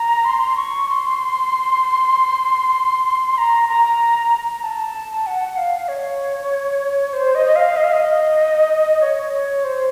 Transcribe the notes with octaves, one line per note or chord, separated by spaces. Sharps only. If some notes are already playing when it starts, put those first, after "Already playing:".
Already playing: A#5
C6
C#6
C6
A#5
A#5
A#5
A5
F#5
F5
C#5
C5
D#5
D#5
F5
D#5
F5
D#5
C#5
C#5
C5